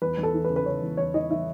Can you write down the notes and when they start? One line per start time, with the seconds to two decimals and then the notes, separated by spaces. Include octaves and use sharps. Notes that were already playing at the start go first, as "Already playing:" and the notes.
0.02 E2 B4
0.18 E2
0.23 A4
0.34 E3
0.45 B4
0.50 C#3
0.56 B4
0.66 C#3 C#5
0.82 E2
0.97 E2 C#5
1.14 E3 D#5
1.30 E3 E5